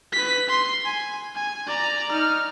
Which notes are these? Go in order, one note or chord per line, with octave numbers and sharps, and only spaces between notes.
B4 B6
C6
G#5
G#5
D5 A#5
D#4 F6